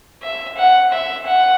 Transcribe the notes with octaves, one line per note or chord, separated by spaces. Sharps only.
E5
F#5
E5
F#5